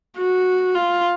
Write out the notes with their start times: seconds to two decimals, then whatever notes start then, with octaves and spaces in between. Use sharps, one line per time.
0.18 F#4
0.75 F4